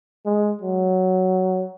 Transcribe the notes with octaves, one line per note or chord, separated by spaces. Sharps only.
G#3
F#3